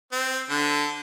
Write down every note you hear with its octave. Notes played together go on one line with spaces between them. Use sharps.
C4
D3